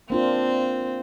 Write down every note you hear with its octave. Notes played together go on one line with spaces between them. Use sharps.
A#3 C4 D4 F4